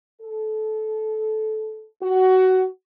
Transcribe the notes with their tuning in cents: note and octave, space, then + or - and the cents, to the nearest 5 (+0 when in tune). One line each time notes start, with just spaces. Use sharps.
A4 -20
F#4 +15